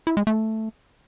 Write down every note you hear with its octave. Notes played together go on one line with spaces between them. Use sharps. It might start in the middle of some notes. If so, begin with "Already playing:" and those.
E4
G#3
A3